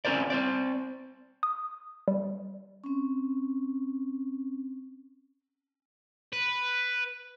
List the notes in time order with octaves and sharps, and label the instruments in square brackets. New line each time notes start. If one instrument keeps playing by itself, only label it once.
[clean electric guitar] C4 C#4 F#4 A#4 C5 D5
C4 C5 D5
[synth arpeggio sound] D#6
G3
[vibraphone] C4 C#4
[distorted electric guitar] B4